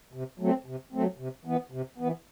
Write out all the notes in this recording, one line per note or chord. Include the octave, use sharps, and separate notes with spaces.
C3
F#3 A3 C4
C3
F#3 A3 C4
C3
E3 B3
C3
E3 B3